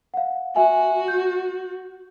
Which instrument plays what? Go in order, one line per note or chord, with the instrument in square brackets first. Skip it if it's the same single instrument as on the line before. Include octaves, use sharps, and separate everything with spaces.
[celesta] F5 F#5
[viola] F#4 [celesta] E5 G#5
[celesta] G6